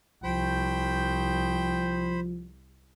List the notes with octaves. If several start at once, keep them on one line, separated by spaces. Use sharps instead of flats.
C2 F3 C5 G5 B5